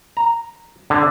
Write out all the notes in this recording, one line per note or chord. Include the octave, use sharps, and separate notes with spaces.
A#5
D3